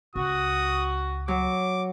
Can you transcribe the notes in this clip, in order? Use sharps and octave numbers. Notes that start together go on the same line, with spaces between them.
C#2 F#4 D#6
F#3 D6